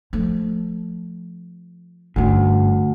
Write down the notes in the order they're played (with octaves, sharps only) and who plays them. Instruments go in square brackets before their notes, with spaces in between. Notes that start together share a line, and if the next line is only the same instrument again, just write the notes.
[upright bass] F3 A3
[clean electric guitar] D2 [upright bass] G2 C#4